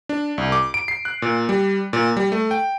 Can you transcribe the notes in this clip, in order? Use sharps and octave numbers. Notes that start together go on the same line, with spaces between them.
D4
C2
D6
D7
C7
F#6
A#2
G3
A#2
G3
A3
G5